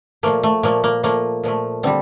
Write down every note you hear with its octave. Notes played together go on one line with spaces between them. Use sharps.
A#2 F3 A3 A#3
A3
A#2 F3 A3 A#3
A#3
A#2 F3 A3 A#3
A#2 F3 A3
D3 G3 C4